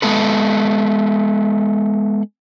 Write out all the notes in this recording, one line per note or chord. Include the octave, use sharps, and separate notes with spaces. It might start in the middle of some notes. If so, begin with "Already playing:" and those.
G#3 B3 A4 B4